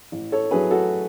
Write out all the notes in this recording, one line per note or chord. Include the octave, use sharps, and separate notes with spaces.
A1
A4 C#5
A2 F#3 A3 G#4 B4
F#4 A4